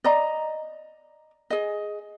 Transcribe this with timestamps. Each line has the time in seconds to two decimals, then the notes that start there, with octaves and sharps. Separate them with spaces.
0.04 D5 D#5 A#5
1.50 G#4 D#5